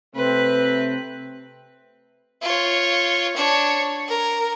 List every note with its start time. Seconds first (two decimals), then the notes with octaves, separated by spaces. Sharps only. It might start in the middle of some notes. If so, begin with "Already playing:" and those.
0.15 C3 A3 C4 B4
2.42 F4 C#5
3.36 D4 C#5
4.08 A#4